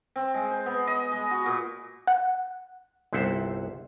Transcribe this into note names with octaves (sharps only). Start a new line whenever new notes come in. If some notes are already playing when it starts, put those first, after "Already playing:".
C4
G#3
C5
B3
D#5
G#3
F#4
A#2
F#5
G1 C2 C5 E5 F#5